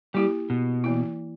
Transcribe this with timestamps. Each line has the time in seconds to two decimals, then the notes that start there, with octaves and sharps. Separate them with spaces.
0.14 G3 A#3 E4 G4
0.50 B2
0.84 E3 A#3 E4